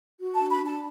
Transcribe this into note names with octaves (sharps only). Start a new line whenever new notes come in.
F#4
A5
D4
B5
D4 A5